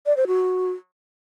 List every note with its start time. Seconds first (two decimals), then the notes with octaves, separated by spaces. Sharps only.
0.06 D5
0.17 C5
0.27 F#4